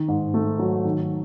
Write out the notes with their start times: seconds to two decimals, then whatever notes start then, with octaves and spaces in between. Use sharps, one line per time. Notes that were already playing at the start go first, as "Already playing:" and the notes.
Already playing: D#3
0.08 G#2
0.34 A3
0.59 F#3
0.85 D#3